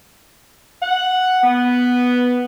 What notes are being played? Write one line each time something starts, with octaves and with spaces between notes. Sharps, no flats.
F#5
B3